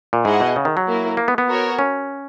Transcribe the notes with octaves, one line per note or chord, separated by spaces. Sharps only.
A#2
G#2 E4 G#4 D#5 F#5
B2
C#3
D#3
F#3
A#3 E4 A#4
A#3
B3
B3
F#4 A#4 C#5
C#4